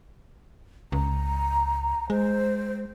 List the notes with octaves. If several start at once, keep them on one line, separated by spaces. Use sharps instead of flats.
C#2 A#5
G#3 C5